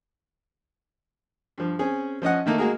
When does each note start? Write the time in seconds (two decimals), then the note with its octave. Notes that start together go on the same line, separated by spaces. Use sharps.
1.58 G2 F3
1.79 C4 C#4 G#4
2.22 F3 C#4 D#5 F#5
2.46 D#3 A3 A#3 D#4
2.58 G#3 A#3 F#4 G#4 A#4